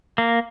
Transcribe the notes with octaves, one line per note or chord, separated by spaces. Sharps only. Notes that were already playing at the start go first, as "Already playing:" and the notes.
A#3